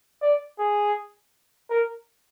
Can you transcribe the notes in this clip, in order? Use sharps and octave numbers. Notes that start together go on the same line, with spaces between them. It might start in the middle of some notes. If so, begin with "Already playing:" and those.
D5
G#4
A#4